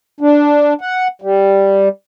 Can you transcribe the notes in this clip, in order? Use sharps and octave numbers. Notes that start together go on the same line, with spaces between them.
D4
F#5
G3